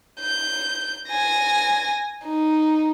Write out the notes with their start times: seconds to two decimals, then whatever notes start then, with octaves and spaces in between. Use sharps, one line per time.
0.20 G6
1.09 G#5 A#6
2.25 D#4